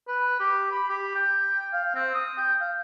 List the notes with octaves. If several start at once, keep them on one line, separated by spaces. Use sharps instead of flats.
B4
G4
B5
G4
G5
F5
C4
D#6
G5
F5